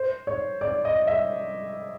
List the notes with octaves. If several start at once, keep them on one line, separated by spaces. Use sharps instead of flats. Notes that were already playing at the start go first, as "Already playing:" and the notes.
Already playing: C5
C#5
D5
D#5
E5